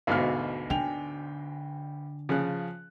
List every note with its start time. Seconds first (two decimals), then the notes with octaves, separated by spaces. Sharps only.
0.07 D2 G#2 B2 F5 A5 F6
0.70 D3 G5 G#5 F7
2.29 C#3 F3 G#4 F#6